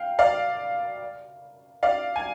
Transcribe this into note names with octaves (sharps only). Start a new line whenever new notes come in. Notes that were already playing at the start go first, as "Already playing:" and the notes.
Already playing: F5 G5
D5 F5
D5 F5
G#5